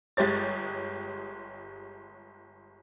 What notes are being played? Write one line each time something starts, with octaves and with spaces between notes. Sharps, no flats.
G1 G#3 G4 C#5 A6